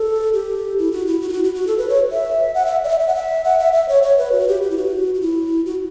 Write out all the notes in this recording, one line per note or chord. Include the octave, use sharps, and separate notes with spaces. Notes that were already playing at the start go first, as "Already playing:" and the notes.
Already playing: A4
G4
E4
F#4
E4
F#4
E4
F#4
F#4
F#4
A4
B4
C#5
E5
F#5
E5
D5
E5
E5
F#5
E5
F#5
E5
E5
C#5
C#5
B4
F#4
G4
G4
E4
F#4
F#4
E4
F#4